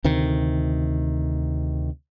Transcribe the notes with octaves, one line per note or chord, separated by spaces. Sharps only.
D2 C3 D#3